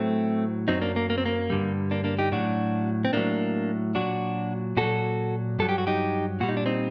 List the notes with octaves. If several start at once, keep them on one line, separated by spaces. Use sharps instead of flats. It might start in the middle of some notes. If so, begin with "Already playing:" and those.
Already playing: A2 F#3 A3 C4
F#2 F#3 C4 D#4
A#3 D4
A#3
A#3
C4
A#3
G2 D3 G3
A#3 D4
A#3 D4
D#4 G4
A2 F#3 D4 F#4
C4
A2 F#3 A#3 D4
A#2 F#3 D4 F#4
A#2 F#3 F#4 A4
G2 F#3 A4
G4
F#4
D#4 G4
A#2 G3 F#4
D#4
D4
C4 D#4